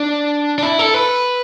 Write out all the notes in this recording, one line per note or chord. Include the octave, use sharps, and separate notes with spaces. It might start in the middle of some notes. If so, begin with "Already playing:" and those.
Already playing: D4
D4
E4
A4
B4